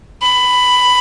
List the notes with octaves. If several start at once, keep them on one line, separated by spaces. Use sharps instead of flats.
B5